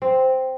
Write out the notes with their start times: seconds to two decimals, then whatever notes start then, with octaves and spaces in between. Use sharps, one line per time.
0.02 C4